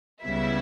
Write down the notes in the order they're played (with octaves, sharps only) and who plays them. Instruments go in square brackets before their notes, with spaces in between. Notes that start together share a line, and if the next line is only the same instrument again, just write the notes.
[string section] C#2 C#3 G3 B3 E4 E5